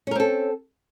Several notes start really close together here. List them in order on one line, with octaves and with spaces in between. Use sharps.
C#4 A#4 C4 A4